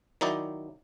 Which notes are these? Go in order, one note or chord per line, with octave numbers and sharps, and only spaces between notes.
D#3 F#3 D#4 E4 D5